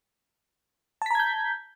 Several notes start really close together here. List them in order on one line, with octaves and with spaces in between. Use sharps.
A5 B6 A#5 G#6 G6